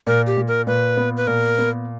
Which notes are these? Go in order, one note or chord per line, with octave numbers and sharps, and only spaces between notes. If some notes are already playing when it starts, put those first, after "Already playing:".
A#2 A#4
G4
A#2
A#4
A#2 B4
B3
B4
A#2 A#4
B3